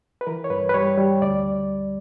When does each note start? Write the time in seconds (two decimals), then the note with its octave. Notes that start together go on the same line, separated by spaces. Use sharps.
0.21 B4
0.27 E3 A#4
0.44 C#5
0.50 G2 B4
0.69 B4
0.74 G3 C#5
0.98 G3
1.22 D2 D5